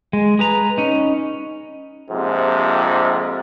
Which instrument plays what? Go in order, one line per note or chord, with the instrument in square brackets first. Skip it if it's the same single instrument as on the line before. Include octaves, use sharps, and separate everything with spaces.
[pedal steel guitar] G#3
G#4 B4 A#5
C#4 D#4
[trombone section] A#1 F2 G#2 C3